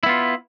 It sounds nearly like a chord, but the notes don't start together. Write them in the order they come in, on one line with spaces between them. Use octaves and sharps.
E4 B3 F4